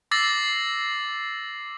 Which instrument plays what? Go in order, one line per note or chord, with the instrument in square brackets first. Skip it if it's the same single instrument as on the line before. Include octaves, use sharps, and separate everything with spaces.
[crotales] D6 E6 A6 A#6 C7 F#7